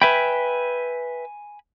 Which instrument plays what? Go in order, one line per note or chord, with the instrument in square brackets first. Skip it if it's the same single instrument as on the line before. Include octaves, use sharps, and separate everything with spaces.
[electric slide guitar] B4 E5 G5 [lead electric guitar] G#5 B5